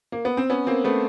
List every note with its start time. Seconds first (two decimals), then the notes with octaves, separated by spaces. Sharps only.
0.12 A#3
0.25 B3
0.37 C4
0.50 B3 C#4
0.67 A#3 C4
0.84 A3 B3